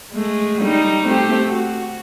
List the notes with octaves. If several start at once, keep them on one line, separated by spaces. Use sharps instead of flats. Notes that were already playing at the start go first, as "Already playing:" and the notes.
G#3 A3
G3 D#4
A3 C4 G4
F#4